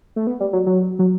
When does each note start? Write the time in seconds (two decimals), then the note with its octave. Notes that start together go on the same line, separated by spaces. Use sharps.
0.16 A3
0.27 B3
0.40 G3
0.53 F#3
0.66 F#3
0.99 F#3